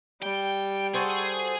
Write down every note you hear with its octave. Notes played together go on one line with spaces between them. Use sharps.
G3 G5
F#4 G#4 A4 C5